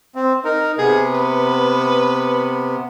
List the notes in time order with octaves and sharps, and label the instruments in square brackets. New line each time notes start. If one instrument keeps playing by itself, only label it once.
[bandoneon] C4
D#4 A#4
[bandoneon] C3 B3 [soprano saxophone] G#4
[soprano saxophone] B4